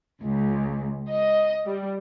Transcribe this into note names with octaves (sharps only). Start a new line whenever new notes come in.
C#2
D#5
G3